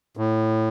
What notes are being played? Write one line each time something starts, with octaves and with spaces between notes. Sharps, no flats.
A2